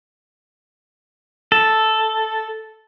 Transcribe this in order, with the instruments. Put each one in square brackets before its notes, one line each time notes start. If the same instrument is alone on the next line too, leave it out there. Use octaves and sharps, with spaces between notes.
[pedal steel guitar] A4